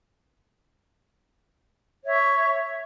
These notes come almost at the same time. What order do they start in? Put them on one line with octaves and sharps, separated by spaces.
C#5 E5 C#6